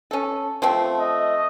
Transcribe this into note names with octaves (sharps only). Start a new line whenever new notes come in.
C#4 A4
F3 A3 C4
D#5